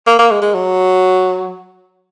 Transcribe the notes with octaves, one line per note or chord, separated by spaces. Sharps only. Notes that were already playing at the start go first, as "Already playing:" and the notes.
A#3
A#3
G#3
G#3
F#3